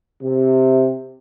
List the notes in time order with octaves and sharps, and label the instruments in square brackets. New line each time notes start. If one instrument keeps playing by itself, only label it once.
[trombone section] C3